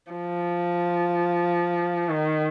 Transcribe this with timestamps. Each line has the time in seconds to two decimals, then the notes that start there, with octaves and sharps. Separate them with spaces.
0.12 F3
2.09 D#3